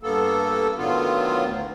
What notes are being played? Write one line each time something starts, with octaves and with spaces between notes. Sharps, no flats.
G2 A#3 B3 A4
A2 D3 D#3 F#3 B3 F4
D2